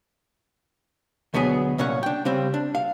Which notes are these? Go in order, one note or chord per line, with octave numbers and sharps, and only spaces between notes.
D2 B2 F#3 B3 G#4
C2 A#2 C#4 C#5 F#5
D4 G5
C#3 G3 C4
D4
F5